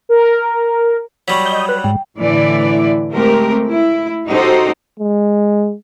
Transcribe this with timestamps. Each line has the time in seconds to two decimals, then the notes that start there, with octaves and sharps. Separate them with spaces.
0.09 A#4
1.28 F#3 G3 C#6 B6
1.45 D#5 G6
1.69 B4 F#6
1.84 G#2 G5
2.18 A2 D3 E3 E4 D5
3.11 G#3 A3 C4 G4 A#4
3.69 E4
4.29 D#4 F#4 G4 A4 C5
5.00 G#3